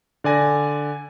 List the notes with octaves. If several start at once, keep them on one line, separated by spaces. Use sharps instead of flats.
D3 D5 G#5 A#6